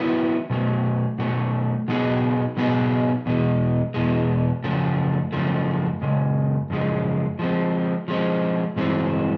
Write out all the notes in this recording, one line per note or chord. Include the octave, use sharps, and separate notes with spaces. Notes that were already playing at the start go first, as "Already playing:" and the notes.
Already playing: D#3 F#3 B3 E4
B2 F#3 A3
B2 F#3 A3
B2 F#3 B3 D#4 G#4
B2 F#3 B3 D#4 G#4
E2 B2 G#3
E2 B2 G#3
F#2 C#3 F3 A3
F#2 C#3 F3 A3
F#2 C#3 G#3
F#2 C#3 F3 G#3
F3 G#3 C4
F3 G#3 C4
G2 E3 G#3 C4